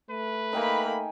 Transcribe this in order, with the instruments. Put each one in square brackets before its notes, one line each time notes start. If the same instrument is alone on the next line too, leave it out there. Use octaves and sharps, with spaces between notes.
[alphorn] A3 [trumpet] B4
[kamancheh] A#3 B5 [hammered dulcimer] D#4 G5 G#5